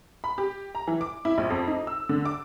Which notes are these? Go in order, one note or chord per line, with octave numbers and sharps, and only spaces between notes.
B5
G4
A#5
E3
D6
E4
A#1
F2
D#4
E6
D3
D6